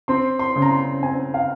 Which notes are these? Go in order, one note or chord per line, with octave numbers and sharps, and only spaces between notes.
C4 C6
C6
C#3
A#5
C6
C4 G#5
F5